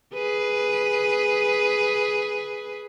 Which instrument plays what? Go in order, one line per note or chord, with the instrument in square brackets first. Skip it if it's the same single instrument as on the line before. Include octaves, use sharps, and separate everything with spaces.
[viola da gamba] G#4 B4